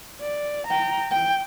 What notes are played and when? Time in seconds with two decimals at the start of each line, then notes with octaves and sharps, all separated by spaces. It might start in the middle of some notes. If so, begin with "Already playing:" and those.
0.21 D5
0.67 G5 A#5
1.11 G5